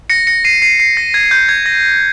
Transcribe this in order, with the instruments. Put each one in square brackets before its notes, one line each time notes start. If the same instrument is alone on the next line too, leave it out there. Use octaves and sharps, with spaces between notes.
[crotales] A#6 C#7
A#6 C#7
C7 D#7
C7 D#7
C7
A#6
G#6
G6
G#6
A#6